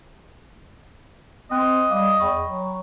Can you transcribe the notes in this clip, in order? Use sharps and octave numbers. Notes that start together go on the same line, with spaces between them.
C4 D#5 G5 F#6
G3 F5 D6 D#6
E2 G5 B5 C#6
F#3